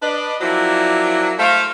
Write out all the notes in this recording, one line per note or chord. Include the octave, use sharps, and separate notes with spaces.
D4 B4 D#5
F3 F#3 A#3 C4 E4 D5
A3 C5 F5